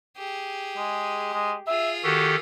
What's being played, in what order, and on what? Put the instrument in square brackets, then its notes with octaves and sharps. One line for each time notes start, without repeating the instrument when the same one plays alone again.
[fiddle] G4 G#4
[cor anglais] G#3
G#3
[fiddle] F4 G#4 [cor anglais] E5
[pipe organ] D#3 G4 A4 [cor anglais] F#4